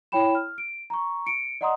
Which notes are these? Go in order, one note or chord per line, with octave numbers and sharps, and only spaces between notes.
E4 C#5 G5 B5 E7
F6
D7
A#5 C#6
C#7 D7
D5 D#5 F#5 A#5 C6 D#6